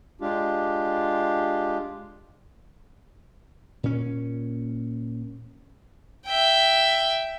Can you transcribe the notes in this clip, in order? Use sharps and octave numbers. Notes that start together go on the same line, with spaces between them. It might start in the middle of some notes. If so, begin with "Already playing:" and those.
G#3 D4 F4 G4
A#2 C#4
E5 G5